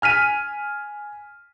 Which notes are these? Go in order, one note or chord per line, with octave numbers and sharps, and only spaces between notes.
G#5 F6 B6 D#7